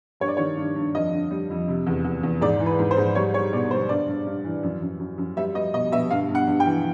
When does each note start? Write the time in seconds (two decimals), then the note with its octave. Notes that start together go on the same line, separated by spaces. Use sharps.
0.20 G2 C#5
0.28 D5
0.37 D#3 C#5
0.57 G2
0.76 G2
0.94 F2 D#5
1.13 D3
1.31 G3
1.50 F2
1.69 C3
1.87 E2
2.04 E2
2.23 E2
2.41 G#2 D5
2.60 E3
2.66 B4
2.79 G#2
2.91 C5
2.97 G#2
3.15 G3 C#5
3.34 G3 C#5
3.53 B2 D5
3.71 G3 C5
3.89 G2 D5
4.08 G2
4.26 G2
4.44 E3
4.63 F#2
4.82 F#2
4.99 F#2
5.18 F#2
5.37 G3 E5
5.55 G3 D#5
5.73 B2 D#5
5.92 B2 E5
6.10 G2 F5
6.29 G2
6.35 F#5
6.47 G2
6.60 G5
6.66 E3